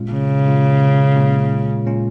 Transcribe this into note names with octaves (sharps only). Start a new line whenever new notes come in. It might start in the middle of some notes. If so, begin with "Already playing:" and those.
Already playing: A#2 G#3 C#4 F4
C#3
A#2 G#3 C#4 F4
A#2 G#3 C#4 F4
A#2 G#3 C#4 F4